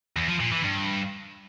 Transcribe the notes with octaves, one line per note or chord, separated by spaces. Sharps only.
E2
F3
A#2
E3
G2